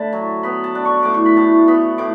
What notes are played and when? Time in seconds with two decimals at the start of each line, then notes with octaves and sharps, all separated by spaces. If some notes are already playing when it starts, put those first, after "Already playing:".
Already playing: D3 A3 A5 B5
0.13 F#3
0.43 B3 B5
0.64 A5
0.75 D4
0.85 C#6
1.03 A2 D6
1.14 C#6
1.26 B5
1.37 A2 A5
1.68 B3 B5
1.98 A2 D6